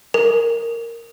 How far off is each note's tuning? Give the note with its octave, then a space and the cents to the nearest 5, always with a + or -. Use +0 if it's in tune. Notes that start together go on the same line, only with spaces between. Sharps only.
A#4 -5